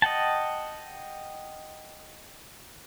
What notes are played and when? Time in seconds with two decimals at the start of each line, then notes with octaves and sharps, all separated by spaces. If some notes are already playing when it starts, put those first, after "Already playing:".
0.02 D#5 F#5 G5 A5